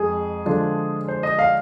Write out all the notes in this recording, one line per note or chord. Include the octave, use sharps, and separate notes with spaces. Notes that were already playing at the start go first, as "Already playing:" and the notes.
Already playing: F2 G#3 G#4
D3 F3 G#3 D4 F4
C5
D#5
F5